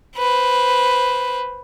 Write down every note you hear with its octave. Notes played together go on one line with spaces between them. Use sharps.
B4 C5